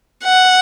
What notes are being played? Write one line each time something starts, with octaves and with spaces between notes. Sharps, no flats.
F#5